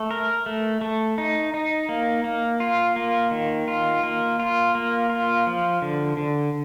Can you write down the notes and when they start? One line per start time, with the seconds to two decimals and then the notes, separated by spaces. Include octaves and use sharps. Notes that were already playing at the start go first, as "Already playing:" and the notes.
Already playing: A3
0.11 A#4
0.46 A3
0.81 A3
1.18 D#4
1.54 D#4
1.89 A#3
2.24 A#3
2.60 F4
2.96 A#3
3.31 D#3
3.68 F4
4.03 A#3
4.39 F4
4.75 A#3
5.10 F4
5.47 F3
5.82 D3
6.17 D3